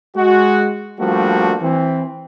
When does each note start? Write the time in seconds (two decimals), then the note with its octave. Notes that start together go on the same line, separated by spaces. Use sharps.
0.16 G#3 F#4
0.99 F3 G3 A3 A#3 D4 F#4
1.62 E3 C4